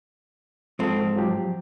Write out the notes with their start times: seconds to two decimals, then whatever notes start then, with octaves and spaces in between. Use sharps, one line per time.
0.79 G#2 F3 C4 A4
1.15 F3 F#3 G4